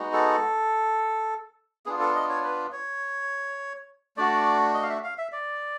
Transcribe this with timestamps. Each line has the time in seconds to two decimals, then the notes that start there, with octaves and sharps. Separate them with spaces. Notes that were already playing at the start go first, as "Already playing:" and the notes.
Already playing: G#3 B3 D#4 F#4
0.13 A4
1.86 B3 D4 F4 G#4
2.00 A4
2.15 D#5
2.29 C#5
2.44 B4
2.72 C#5
4.17 A3 D4 F#4 D5
4.74 D#5
4.82 F5
4.89 E5
5.04 F5
5.18 E5
5.32 D5